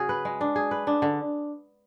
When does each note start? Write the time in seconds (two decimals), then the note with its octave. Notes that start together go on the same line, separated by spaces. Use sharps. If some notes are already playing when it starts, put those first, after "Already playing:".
Already playing: C#3 C#4 F#4 G#4
0.09 B4
0.25 G#3
0.41 D4
0.56 G#4
0.71 B4
0.87 D4
1.02 D3